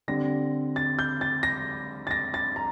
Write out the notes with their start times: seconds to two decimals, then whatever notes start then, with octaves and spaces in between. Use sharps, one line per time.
0.08 D3 G3 C4 A#6
0.76 A6
0.99 G6
1.21 A6
1.43 A#6
2.07 A6
2.11 A#6
2.34 A6
2.56 A#5